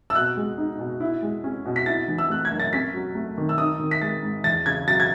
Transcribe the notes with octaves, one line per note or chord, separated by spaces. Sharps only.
E6
B2 F#6
G#3
D#4
B2
E4
G#3
C#4
B2
B6
E4 A6
E3
E6
A3 F#6
G#6
F#2
A6
C#4 B6
F#3
A3
D#3
E6
D#4 D#6
D#3
B6
G#3 A6
G#2
E2 A6
C#3 G#6
F#3 A6
G#6